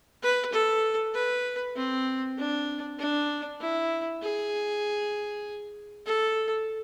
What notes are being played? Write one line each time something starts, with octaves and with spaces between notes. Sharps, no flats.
B4
A4
B4
C4
D4
D4
E4
G#4
A4